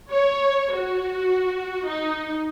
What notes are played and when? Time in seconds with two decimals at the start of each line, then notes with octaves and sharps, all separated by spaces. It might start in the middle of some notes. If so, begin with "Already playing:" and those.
0.10 C#5
0.73 F#4
1.87 D#4